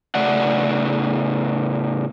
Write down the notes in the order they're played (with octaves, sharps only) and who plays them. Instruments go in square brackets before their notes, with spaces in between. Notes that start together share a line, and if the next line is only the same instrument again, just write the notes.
[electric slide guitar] A2 C#3 A3 D5 F#5